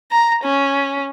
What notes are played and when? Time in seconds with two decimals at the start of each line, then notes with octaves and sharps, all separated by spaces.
0.12 A#5
0.45 C#4